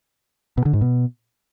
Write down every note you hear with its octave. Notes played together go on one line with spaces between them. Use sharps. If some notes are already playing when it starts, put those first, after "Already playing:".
B2
D3
G#2
B2